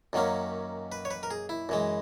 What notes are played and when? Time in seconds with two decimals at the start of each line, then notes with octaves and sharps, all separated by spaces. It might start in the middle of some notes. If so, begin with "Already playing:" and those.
0.13 F#2 D#3 F#3 A#3 C#4
0.92 B4
1.05 C#5
1.11 B4
1.23 A#4
1.31 G#4
1.49 E4
1.69 F#2 E3 G#3